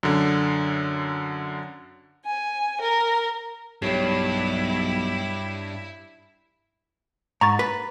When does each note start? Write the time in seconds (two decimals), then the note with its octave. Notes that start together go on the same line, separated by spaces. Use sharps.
0.03 F#2 D3
2.25 G#5
2.80 A#4
3.82 B1 G2 E4 G4 C#5
7.41 G#2 A#5 C#6 A6
7.59 B4